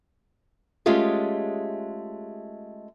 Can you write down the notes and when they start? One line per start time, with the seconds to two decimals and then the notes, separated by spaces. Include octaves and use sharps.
0.86 G#3 A3 C#4 F4 G4 G#4